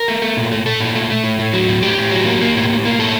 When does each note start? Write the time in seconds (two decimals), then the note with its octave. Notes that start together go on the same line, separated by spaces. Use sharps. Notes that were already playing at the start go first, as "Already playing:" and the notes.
Already playing: A#4
0.08 A3
0.22 A3
0.37 A#2
0.51 A3
0.66 A3 A4
0.80 A#2
0.95 A3
1.10 A3
1.24 A2
1.39 A2
1.53 F#3
1.68 A2
1.83 A2 G4
1.97 A2
2.12 F#3
2.26 A#3
2.41 A#3
2.56 A2
2.70 A2
2.85 A#3
2.99 A2 A4